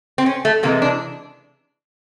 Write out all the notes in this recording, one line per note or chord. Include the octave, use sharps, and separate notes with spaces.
C4
C#4
A3
C3 E3 G#3 A#3
D4